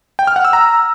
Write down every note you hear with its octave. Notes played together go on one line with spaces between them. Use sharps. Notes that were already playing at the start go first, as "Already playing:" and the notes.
G5
F6
F#5
E6
A#5